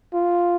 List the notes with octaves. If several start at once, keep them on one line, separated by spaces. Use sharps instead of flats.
F4